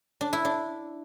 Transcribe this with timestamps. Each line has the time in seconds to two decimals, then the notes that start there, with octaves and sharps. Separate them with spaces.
0.21 D4
0.33 E4
0.45 D4